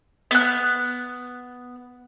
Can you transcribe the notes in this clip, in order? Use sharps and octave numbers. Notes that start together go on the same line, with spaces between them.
B3 F#6